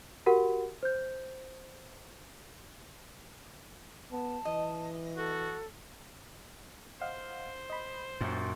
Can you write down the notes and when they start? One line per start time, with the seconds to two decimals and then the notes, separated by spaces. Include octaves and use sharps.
0.26 F#4 G4 A#4 F#5
0.83 C5 G6
4.12 B3 A5
4.45 E3 D#5
5.17 F#4 A4
7.01 C5 D#5 F5 F#5
7.70 D#5 B5
8.21 F#2 A#2 G5 C6 A6